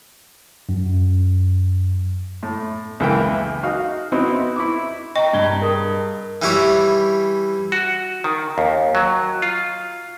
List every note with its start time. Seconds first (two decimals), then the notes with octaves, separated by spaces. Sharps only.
0.69 F#2
2.43 A2
3.00 C#2 F#2 E3 A#3 E5 G5
3.63 D#4 F#4 F5
4.12 B3 C4 D#4 E4 F#4
4.56 E4 C#6 D6
5.16 D#5 G5 A#5 C#6
5.33 G2 D4 G#6 G7
5.60 G#4 A#4 D#6
6.42 E3 G3 E4 C#5
7.72 F#4
8.24 D#3
8.58 D#2
8.95 F#3
9.42 F4